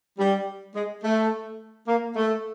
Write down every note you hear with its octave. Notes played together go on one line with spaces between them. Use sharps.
G3
G#3
A3
A#3
A3